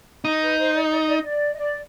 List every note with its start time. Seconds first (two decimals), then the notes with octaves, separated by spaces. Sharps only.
0.25 D#4
0.41 B4
0.58 C5
0.74 D5
0.82 D#5
0.91 D5
0.99 D#5
1.08 D5
1.16 D#5
1.24 D5
1.53 D#5
1.57 D5